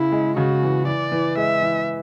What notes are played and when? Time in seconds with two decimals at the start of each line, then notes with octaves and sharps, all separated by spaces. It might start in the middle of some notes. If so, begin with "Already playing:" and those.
Already playing: C#3 E4
0.12 G#3
0.37 C#3 F#4
0.63 E3
0.87 E3 D5
1.12 E3
1.37 G#3 E5
1.62 E3